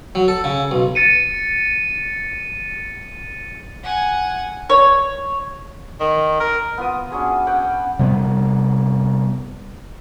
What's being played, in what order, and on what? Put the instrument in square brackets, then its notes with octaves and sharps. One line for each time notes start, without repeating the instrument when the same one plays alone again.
[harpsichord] F#3
A4
C#3
B1
[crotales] A6 C#7 D#7
[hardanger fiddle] F#5 G#5
[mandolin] C#5
[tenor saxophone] D#3
A#4
[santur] B3 F4 D#6
C#4 D4 F#4 G#4
C#4 F#5 G5
[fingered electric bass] C3 G3 A#3 B3